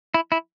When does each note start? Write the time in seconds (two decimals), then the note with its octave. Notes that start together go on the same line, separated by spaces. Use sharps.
0.14 E4
0.32 E4